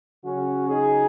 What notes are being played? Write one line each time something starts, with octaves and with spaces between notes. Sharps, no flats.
C#3 F#3 C#4 F#4
D#4 G#4